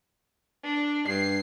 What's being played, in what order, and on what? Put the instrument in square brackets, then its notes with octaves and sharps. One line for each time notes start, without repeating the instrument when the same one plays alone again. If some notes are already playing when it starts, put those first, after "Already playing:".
[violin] D4
[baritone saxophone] G2 [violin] C7